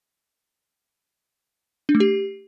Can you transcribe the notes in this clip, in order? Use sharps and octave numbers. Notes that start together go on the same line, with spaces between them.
D4
A3
G4